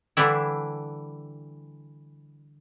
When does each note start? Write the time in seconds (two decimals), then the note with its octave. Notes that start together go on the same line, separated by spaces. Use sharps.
0.17 D3 E3 G3 D4 E4